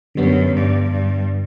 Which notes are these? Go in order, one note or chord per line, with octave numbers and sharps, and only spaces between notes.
F#2 D3 G3 B3
G2
G2